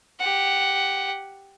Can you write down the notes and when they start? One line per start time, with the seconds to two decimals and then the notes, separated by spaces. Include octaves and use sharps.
0.20 G4 F#5